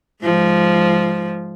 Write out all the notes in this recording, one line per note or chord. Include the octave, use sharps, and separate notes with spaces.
G#2 F3